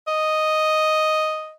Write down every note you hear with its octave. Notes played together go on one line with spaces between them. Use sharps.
D#5